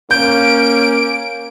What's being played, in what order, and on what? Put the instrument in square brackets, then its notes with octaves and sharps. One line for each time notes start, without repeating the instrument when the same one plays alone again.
[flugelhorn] A#3 [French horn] C#4 [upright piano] G6 [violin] D7